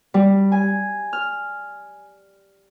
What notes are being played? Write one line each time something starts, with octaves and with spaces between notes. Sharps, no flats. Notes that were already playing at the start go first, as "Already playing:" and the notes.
G3
G#5
F6